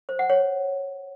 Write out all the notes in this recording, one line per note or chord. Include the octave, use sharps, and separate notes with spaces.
C5
F#5
C#5